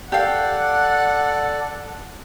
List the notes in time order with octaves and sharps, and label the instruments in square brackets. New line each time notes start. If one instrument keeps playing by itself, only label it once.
[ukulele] G4 F5 [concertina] A4 D5 [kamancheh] F#5